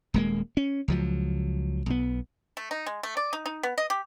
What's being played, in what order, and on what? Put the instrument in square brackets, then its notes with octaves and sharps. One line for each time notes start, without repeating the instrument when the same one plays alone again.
[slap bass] D#1 G#3 A#3
C#4
C#2 F3 F#3
B1 B3
[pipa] A3
D#4
G#3
A3
D5
D#4
D#4
B3
D#5
G4